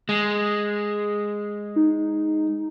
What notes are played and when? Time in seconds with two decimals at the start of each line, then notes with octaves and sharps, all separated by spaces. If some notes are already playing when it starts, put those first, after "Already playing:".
0.09 G#3
1.76 D#4